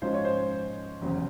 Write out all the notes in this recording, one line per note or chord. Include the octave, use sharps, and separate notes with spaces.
G#2 F3 G#3 C#4 F4 C5
C#5
C5
F1 E2 C#3 F#3